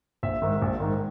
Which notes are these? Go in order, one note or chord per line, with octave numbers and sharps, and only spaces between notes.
A#1 E5
G#2 D#3
A#1
G#2 D#3